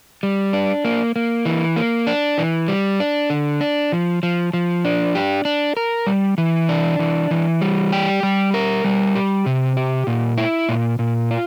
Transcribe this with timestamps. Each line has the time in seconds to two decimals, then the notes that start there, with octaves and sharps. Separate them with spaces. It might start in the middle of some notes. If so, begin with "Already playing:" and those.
0.23 G3
0.53 D4
0.85 A#3
1.16 A#3
1.46 E3
1.76 A#3
2.07 D4
2.38 E3
2.68 G3
3.00 D4
3.30 D3
3.61 D4
3.92 F3
4.23 F3
4.53 F3
4.85 D4
5.15 G4
5.45 D4
5.77 A#4
6.07 G3
6.38 E3
6.69 D4
6.99 E3
7.31 E3
7.62 G3
7.92 G4
8.23 G3
8.54 A#4
8.84 G3
9.15 G4
9.46 C3
9.77 G4
10.07 A#2
10.38 E4
10.69 A#2
10.99 A#2
11.31 F4